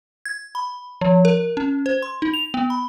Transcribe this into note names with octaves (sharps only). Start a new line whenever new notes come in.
G#6
B5
F3
A#4
C#4
C5
C6
D#4
F7
B3
B5